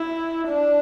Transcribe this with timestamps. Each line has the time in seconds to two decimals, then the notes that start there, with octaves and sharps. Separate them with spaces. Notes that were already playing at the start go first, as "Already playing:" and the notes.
Already playing: E4
0.48 D4